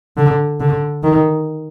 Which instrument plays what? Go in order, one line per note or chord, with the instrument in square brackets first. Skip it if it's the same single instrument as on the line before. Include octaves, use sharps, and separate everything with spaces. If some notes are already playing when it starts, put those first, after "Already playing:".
[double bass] D3
D3
D#3